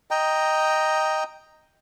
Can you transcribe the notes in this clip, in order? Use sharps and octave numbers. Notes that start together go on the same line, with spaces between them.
D#5 G5 A#5